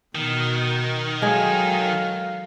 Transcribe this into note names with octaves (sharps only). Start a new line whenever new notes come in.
B2 D#3 D#4 F#4
F#3 G#3 G#4 A4 F5